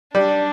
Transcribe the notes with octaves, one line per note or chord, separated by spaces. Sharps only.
G3 D4